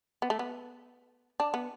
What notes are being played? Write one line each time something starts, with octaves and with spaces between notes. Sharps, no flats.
B3
A3
B3
D4
B3